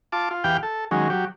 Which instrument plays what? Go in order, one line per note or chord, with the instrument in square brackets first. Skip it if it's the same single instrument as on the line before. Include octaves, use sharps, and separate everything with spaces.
[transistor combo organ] F4 A5 D6
F4
E2 G4 F5 G5
A4
D#3 F#3 G#3 C#4
F#3 G4